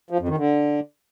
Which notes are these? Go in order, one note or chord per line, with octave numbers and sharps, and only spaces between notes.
F3
F2
D#3
D3